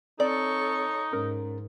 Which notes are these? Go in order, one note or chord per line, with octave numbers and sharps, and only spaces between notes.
C4 D#4 A4 C#5 D5 C#6
G#2 C#4 A#4